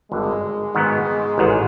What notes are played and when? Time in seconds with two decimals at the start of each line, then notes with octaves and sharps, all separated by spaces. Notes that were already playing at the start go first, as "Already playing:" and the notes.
0.11 G#1 G2 D3 G#3
0.75 G#2 D#3 F#3 B3
1.38 A1 G#2 D#3